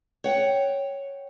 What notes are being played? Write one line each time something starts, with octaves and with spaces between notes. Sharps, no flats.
C#5 F#5 G5